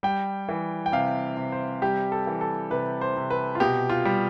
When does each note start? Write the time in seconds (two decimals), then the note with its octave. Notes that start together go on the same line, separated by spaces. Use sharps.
0.03 G3 G5
0.49 E3
0.86 G5
0.92 C3 F5
1.37 C3
1.52 C5
1.82 G3 G4
2.12 A4
2.27 E3
2.41 A4
2.71 C3 B4
3.01 C5
3.16 C3
3.30 B4
3.55 F4
3.60 B2 G4
3.89 F4
4.05 G3